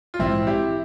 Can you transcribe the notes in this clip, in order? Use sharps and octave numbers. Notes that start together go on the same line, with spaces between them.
F4
A#1 G#2 E3 G#3 C4 E4
E4 G4